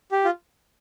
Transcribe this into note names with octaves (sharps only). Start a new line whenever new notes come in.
G4
F4